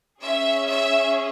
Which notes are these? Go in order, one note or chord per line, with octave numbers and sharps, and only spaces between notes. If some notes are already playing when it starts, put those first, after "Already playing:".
C#4 G#4 E5
E5